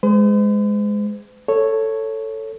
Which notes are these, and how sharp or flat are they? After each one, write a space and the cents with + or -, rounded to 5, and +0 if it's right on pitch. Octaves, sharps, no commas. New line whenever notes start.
G#3 +0 C5 -45
A4 +10 C#5 -5